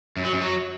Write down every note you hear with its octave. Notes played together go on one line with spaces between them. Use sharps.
F#2
F#3
F#2
F#3